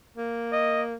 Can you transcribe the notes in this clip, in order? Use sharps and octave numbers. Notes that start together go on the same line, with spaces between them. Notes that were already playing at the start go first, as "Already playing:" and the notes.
A#3
D#5